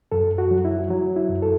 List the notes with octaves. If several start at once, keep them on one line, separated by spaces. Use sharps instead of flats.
F#2 A4
F#4
F#3
E4
F#3
E4
F#2
A4